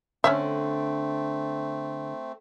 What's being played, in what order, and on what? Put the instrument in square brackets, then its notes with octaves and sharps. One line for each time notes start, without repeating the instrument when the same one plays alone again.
[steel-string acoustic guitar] D3 [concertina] A3 C4 [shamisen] C#4 C#5 E5